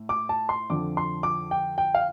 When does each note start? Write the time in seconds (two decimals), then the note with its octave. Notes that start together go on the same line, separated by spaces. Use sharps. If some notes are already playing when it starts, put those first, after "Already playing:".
Already playing: A2
0.09 D6
0.29 A5
0.49 C6
0.70 F2 D3 F3 D6
0.97 C6
1.23 D6
1.51 G5
1.78 G5
1.95 F5